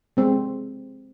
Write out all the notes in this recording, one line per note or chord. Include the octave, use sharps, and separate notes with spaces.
G#3 C4